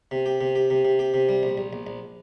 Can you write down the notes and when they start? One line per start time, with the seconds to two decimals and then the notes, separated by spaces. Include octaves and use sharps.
0.11 C3
0.26 G4
0.41 C3
0.55 G4
0.70 C3
0.85 C3
0.99 G4
1.14 C3
1.29 G3
1.43 A#1
1.58 A#1
1.73 A#1
1.87 A#1